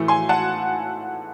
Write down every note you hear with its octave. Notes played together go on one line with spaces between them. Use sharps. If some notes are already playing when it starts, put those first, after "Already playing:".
Already playing: A2 E3 A3
G#5 C6
F#5 A5